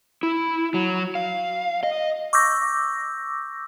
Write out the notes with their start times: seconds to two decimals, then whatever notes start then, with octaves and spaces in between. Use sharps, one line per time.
0.23 E4
0.74 F#3
1.15 F5
1.83 D#5
2.33 C#6 D6 E6 G6 A#6